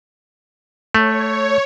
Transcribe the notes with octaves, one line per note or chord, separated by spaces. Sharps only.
A3 C#5